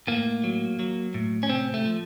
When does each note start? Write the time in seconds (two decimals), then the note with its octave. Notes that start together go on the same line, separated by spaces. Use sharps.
0.07 A2 A#3
0.44 F#3
0.79 F#3
1.14 A2
1.43 C#4
1.50 C3 C4
1.74 A3
1.85 F3